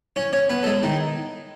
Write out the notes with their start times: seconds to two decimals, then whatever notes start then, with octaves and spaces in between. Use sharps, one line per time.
0.16 C#4 C#5
0.33 C#4 C#5
0.49 B3 B4
0.63 A4
0.66 G#3 G#4
0.83 D#3 D#4